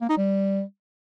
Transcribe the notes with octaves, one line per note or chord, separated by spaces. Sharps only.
A#3
D#4
G3